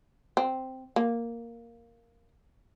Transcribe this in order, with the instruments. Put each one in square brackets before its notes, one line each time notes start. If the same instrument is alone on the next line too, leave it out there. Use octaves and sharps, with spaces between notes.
[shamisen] C4
A#3